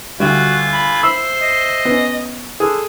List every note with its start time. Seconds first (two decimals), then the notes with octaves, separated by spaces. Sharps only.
0.20 D2 D3 G3 F4 F#4 G#5
0.73 B5
1.03 C5 E5 C6 E6
1.39 D#5
1.85 B3 C#4
2.60 D3 G#4 A4